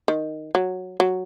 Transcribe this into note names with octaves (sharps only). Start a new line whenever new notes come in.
D#3
F#3
F#3